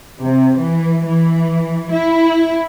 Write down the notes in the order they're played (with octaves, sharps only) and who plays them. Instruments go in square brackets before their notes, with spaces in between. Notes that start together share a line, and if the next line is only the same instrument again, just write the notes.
[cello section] C3
E3
E3
E4